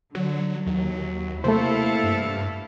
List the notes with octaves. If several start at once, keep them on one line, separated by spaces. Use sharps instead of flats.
D3 F#3
D#2 F#3
C3 A3 A#3 E4 A4 C5 F5
G2